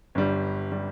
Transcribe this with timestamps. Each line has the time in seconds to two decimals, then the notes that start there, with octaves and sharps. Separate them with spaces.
0.15 G1 G2 G3
0.72 G3